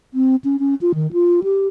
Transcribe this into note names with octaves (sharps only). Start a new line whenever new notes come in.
C4
C#4
C#4
F4
D#3
F4
G4